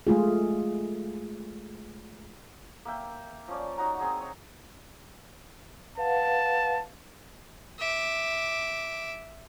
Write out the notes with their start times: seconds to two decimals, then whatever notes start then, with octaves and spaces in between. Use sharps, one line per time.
0.07 G#3 A3 F4 G#4
2.85 A#3 E5 G5
3.48 F3 C#4 D5
3.78 F#3 D#4 F#5 A#5
3.99 C4 G#4 D#5
4.21 C#5
5.98 B4 F5 F#5 A5
7.79 E5 D6